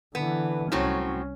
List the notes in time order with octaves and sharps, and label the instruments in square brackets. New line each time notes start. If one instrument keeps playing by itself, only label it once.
[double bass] D3 E3 [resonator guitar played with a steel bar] B3
[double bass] C2 C#4 [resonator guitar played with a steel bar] A2 F#3 C4